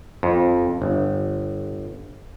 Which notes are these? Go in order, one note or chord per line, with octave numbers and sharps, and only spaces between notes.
F2
G1